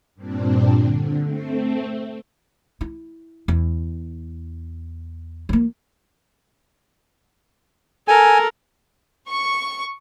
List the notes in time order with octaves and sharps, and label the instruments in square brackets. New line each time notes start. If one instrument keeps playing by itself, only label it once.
[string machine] G2 A#2 C4 D4
D3
A3 C4
[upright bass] E4
E2
F3 A#3
[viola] A4 A#4 [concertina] G#5
[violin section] C#6